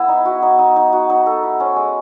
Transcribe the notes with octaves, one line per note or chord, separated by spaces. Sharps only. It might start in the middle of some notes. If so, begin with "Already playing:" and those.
Already playing: B3 E4 G#4
D#4
F#4
D#4
D#4
D#4
F#4
D#4
A4
E4
C#4
G#3